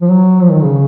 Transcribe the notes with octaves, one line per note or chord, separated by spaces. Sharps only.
F3
F#3
F3
D#3
C#3